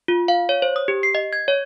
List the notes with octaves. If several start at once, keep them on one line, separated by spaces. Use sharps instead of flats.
F4
F5
C#5
C5
D#6
G4
C7
D#5
G#6
C#5